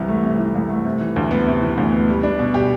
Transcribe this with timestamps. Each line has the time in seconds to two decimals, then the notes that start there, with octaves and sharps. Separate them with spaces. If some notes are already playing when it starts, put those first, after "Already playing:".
Already playing: C2 C3 E3
0.08 A3
0.23 C3
0.39 E3
0.55 C2
0.70 A3
0.85 C3
1.00 E3
1.16 D2
1.31 B3
1.47 C3
1.62 E3
1.78 D2
1.92 B3
2.08 G3
2.23 D4
2.39 B2
2.54 G4